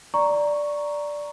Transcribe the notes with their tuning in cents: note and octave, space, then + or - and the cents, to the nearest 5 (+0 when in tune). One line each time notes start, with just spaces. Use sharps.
D5 +0 A#5 +0 C#6 +0